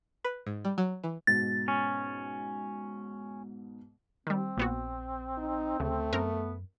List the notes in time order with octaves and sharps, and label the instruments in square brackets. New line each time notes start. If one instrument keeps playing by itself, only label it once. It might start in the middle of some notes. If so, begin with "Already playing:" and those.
[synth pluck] B4
G#2
G3
F#3
E3
[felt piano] G#2 B2 [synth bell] A6
[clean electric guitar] C#4
[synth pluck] D#3 G3 [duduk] C4
[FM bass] A#1 [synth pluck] A#2 B3 F#4
[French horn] D#4
[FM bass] D2 [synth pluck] C#3 [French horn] A3
[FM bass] F#2 [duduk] B3 [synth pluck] C4 A#4